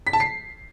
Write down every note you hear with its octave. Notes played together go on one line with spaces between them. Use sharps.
B6
A5
C7